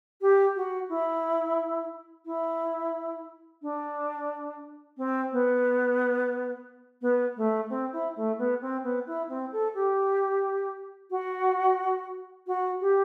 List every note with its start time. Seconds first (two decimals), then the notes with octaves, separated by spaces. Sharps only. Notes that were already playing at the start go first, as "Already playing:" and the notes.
0.21 G4
0.56 F#4
0.89 E4
2.26 E4
3.62 D4
4.98 C4
5.32 B3
7.02 B3
7.37 A3
7.70 C4
7.93 E4
8.16 A3
8.39 B3
8.61 C4
8.84 B3
9.07 E4
9.29 C4
9.52 A4
9.74 G4
11.11 F#4
12.47 F#4
12.81 G4